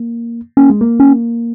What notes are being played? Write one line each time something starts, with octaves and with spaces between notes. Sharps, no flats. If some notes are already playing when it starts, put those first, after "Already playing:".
Already playing: A#3
A#3 C#4
G#3
A#3
C#4